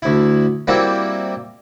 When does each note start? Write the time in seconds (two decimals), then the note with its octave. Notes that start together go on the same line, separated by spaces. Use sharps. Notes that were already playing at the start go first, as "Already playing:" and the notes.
0.02 D2 E4
0.67 G3 A#3 C4 E4 F#4